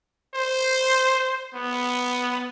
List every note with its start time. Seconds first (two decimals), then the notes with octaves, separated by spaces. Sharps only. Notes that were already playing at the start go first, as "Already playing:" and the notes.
0.35 C5
1.55 B3